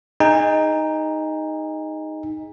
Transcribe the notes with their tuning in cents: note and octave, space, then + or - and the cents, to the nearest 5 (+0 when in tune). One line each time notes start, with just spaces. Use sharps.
D#4 +0 G#4 +0 G#5 -40